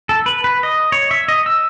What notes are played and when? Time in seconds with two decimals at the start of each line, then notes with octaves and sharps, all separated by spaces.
0.09 A4
0.26 B4
0.44 B4
0.63 D#5
0.92 C#5
1.11 E5
1.28 D#5
1.46 E6